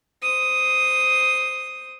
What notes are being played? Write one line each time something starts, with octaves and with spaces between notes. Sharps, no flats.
C5 D#6